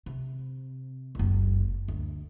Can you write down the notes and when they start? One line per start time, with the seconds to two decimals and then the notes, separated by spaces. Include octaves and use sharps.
0.06 C3
1.15 F#1 C#2
1.88 D2